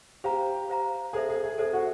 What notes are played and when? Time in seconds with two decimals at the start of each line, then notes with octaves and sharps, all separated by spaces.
0.24 G4 C5 F5 A#5
0.69 C5 F5 A#5
1.13 G#4 A4 C5 E5
1.29 G#4
1.43 G#4
1.58 G#4 A4 C5 E5
1.73 F#4